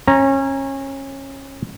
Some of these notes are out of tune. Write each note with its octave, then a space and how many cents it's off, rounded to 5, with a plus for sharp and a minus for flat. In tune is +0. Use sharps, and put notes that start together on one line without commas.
C#4 -25 A#5 +0